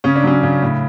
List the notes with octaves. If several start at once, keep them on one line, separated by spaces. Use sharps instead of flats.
C#3 C#4
D4
F#3 C#4
C#3
A2